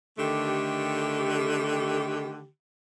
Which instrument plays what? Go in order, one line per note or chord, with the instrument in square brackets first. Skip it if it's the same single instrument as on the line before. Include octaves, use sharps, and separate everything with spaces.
[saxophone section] D3 D#3 A3 G4